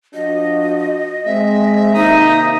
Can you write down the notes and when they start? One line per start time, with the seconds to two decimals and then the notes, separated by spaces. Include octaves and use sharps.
0.14 F3 D4 F#4 D#5
1.26 G#3 C4 E5
1.94 C3 D#3 A#3 D#4 A#5 D#6